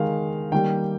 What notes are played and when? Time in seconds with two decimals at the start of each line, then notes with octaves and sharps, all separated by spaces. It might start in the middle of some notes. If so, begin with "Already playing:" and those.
Already playing: D#3 G#3 F5
0.52 D#3 G3 A#3 G5